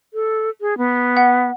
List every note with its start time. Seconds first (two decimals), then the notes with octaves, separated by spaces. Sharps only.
0.14 A4
0.61 G#4
0.78 B3
1.17 F#5